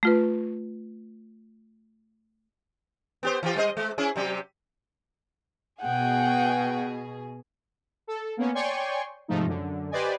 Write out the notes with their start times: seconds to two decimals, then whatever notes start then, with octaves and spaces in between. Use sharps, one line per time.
0.03 A3 F4 B4
3.23 B3 G4 C5
3.43 E3 F4 G4
3.56 G3 C5 D#5
3.77 G#3
3.98 C#4 E4 G#4
4.16 C3 F#3 G4
5.82 B2 G#4 F#5 G5
8.07 A4
8.37 A#3 B3 C#4
8.55 C#5 D5 G5 G#5 C6 C#6
9.28 G#2 C3 F3 A3 D#4
9.46 F#2 D3
9.91 G4 B4 C5 D5 D#5 G#5